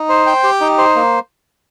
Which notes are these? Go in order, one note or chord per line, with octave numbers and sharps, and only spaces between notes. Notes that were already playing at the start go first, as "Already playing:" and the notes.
Already playing: D#4
C5
G5
G4
D#4
C5
A#3